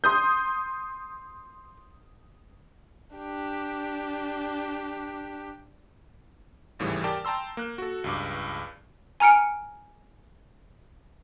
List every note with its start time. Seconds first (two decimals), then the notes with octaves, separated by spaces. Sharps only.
0.04 C6 D#6 G6
3.16 D4 G4
6.79 G#1 D#2 A2 C#3 E3 G3
7.04 G4 A#4 D5 G5 A5
7.25 G5 A5 A#5 C6 E6
7.57 A#3 F#6
7.78 F#4 A4
8.04 C#2 G2 D6
9.20 G#5 A#5 F6 C#7 D7